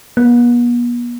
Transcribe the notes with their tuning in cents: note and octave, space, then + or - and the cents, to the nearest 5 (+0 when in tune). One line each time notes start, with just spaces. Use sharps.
B3 -45